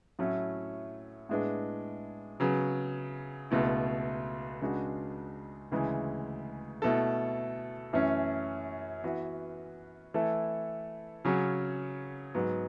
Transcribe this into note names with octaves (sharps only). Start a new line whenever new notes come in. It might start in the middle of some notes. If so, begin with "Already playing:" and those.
A2 F#3 A3 C#4 E4
A2 G#3 B3 D4
C#3 F#3 B3
C#2 B2 A3 E4
C#2 C#3 G#3 D4 F#4
D2 C#3 E3 G#3
B2 A3 E4 A4
F#2 E3 A3 C#4
E3 B3 F#4 B4
E3 A3 E4 A4
C#3 F#3 C#4
G#2 F#3 B3